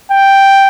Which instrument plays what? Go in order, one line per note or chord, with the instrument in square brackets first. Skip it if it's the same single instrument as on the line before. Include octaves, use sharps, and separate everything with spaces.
[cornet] G5